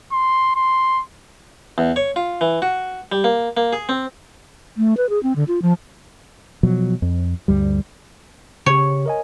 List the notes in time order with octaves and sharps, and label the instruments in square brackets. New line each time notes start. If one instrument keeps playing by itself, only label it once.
[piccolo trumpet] C6
C6
[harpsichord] E2
C#5
F4
E3
F#4
G3
A#3
A#3
G#4
C4
[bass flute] A3
B4
G#4
C4
D3
F4
F3
[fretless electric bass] B2 F3 F#3
F2
D2 G2 G3
[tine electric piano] C#3 G4 [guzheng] C#5
[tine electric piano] A#4 D#5 G#5